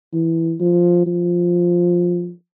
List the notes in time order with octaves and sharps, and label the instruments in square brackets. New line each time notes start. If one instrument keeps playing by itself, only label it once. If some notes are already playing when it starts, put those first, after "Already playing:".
[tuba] E3
F3
F3